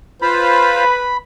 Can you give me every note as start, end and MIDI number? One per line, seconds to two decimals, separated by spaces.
0.22 0.84 65
0.22 1.21 71
0.22 0.84 72
0.22 0.84 77
0.22 1.17 83